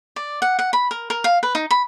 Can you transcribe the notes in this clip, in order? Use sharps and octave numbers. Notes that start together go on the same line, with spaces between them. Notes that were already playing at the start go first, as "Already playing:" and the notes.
D5
F#5
F#5
B5
A#4
A#4
F5
B4
D#4
B5